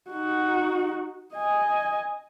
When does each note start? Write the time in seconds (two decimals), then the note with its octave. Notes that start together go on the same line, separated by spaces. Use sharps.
0.10 D#4 F#4
1.34 D#5 G#5